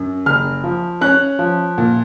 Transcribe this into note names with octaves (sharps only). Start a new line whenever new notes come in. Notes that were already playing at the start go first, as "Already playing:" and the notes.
Already playing: F#2
F#1 F6
F3
C#4 F#6
F3
A#2